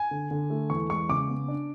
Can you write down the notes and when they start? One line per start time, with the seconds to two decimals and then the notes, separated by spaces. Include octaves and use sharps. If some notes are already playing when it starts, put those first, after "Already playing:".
Already playing: G#5
0.11 D3
0.31 D3
0.50 A3
0.70 E2 C#6
0.89 G#3 C#6
1.09 C#3 D6
1.29 B3
1.48 D4